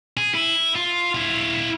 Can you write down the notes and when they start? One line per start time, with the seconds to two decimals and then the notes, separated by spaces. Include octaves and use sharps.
0.17 G#4
0.34 E4
0.75 F4
1.15 E4 F5